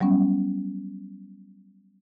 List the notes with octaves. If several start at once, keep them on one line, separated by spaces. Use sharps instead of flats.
F#3 G3 B3 C#4